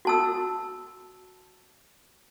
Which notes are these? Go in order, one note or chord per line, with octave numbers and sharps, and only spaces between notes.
F#4 A5 E6